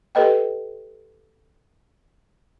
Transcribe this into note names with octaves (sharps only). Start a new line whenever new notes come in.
G4 A4 B4 D#5 G5